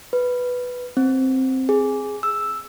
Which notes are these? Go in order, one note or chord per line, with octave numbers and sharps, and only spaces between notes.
B4
C4
G#4
E6